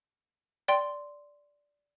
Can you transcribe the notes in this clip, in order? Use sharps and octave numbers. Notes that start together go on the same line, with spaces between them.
D5 G5 C6